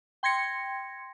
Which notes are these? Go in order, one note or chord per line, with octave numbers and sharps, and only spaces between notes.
G5 C6 G#6 A#6 C#7